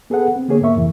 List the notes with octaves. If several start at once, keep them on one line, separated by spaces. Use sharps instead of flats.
B3 G#4 A4 B4 F#5
C4
D3 A#3 B3 G#4 C#5
G#2 A#3 A#4 E5 C#6
F2 C3 E3